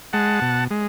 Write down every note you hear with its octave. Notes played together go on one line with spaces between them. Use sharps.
G#3 F#5 A5
B2
G#3